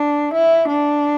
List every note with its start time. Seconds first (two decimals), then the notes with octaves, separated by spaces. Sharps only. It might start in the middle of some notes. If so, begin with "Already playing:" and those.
Already playing: D4
0.35 E4
0.68 D4